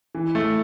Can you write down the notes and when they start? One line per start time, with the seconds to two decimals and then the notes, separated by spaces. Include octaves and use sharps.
0.15 E3
0.35 A3